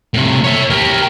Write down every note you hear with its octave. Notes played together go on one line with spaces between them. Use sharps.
A2 C3
C#5 E5
G4 A#4